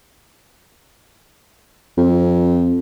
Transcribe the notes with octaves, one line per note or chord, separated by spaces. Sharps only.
F2